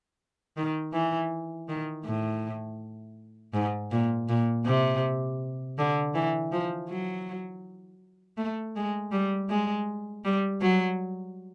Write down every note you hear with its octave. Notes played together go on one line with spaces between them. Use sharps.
D#3
E3
D#3
A2
G#2
A#2
A#2
C3
D3
E3
F3
F#3
A3
G#3
G3
G#3
G3
F#3